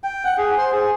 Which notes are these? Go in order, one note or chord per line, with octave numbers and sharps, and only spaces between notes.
G5
F#5
G#4
C5
G#4